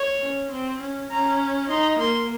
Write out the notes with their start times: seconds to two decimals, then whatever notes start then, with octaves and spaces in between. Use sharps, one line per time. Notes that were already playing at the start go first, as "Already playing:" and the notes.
Already playing: C#5
0.22 C#4
0.52 C4
0.81 C#4
1.10 C#4 A#5
1.70 D#4 C6
2.00 A#3 C6